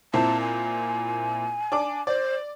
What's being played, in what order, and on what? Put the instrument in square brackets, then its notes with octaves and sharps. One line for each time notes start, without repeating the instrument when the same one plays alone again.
[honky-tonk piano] A#2 C4 E4 [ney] A5
[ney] G#5
[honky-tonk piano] D4 D6
[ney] C5 [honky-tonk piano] D5